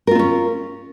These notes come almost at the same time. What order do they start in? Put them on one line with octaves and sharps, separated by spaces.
A#4 F4 C4 C#4